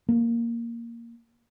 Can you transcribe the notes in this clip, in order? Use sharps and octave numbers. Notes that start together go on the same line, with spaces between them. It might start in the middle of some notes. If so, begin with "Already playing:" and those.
A#3